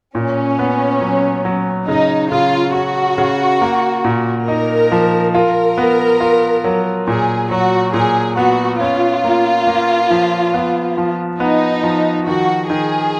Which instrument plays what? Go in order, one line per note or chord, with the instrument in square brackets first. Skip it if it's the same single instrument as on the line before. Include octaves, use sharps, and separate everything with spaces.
[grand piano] A#2 [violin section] C#4
[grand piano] B3
F#3
F#3
[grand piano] C#3 [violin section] D#4
[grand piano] C#3 [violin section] F4
[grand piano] C#4 [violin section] F#4
[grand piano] C#3
A#3
A#2
[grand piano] D#4 [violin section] A#4
[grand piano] F3
[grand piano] F4 [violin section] A#4
[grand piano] B3
F4
F#3
[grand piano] A#2 [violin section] G#4
[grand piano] F#3 [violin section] F#4
[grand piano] A#2 [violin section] G#4
[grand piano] B3 [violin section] F#4
[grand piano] C#4 [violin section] F4
[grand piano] A#3
A#3
F3
B3
F3
[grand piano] B3 [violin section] D#4
[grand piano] F3
[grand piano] D#3 [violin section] F#4
[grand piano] D#3 [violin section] G#4